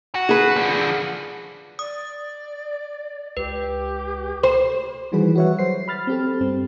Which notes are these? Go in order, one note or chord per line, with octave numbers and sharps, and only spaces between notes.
F#4
G#4 B4
D3 F3
D5 D#6
C#2 G4 B4
C5
D#3 E3 G3 F#4 G#4 B4
F#4 B4 C#5 E5 F#5
F#3 C5 C7
B5 F6 A6
C4 G4 A4
G2 C4